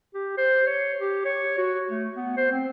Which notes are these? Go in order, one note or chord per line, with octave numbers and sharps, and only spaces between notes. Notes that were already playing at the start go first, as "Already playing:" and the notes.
G4
C5
C#5
G4
C#5
F#4
A3
B3
C5
C4